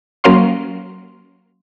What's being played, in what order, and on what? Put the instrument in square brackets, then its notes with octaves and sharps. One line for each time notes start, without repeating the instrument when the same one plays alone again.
[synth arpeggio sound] F#3 A#3 C#4 F5 C6